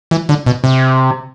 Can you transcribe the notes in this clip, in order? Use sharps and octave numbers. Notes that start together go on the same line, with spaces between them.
E3
D3
B2
C3